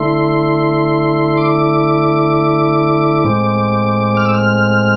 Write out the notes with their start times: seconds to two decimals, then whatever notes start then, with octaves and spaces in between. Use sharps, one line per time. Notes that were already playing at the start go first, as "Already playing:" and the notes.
Already playing: D3 A3 E4 C6
1.37 D6
3.24 A2 G#3 C4
4.17 F6
4.25 E6
4.34 F6